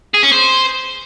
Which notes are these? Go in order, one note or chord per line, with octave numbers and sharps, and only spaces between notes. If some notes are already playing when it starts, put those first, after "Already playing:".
G#4
C#4
C5